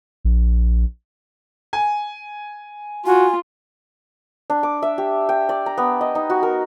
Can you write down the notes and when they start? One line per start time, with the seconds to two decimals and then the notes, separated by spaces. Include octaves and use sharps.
0.25 A#1
1.73 G#5
3.06 F4 F#4 G#5
4.50 D4
4.63 D6
4.82 E5
4.98 G4
5.29 G5
5.49 D5
5.66 A#5
5.78 B3
6.01 D#5
6.15 D#4
6.30 F#4
6.43 A#4